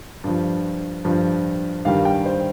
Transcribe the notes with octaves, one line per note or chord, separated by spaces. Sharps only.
G2 F3
G2 F3
G2 D#3 G3 F5
G5
C5